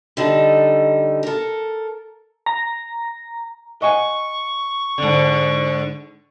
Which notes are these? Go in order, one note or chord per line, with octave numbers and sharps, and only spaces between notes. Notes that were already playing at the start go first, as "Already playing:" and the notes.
D3 G3 D#4 A4
A4 A#4
A#5
D#5 F#5 G#5 C#6
G#2 D3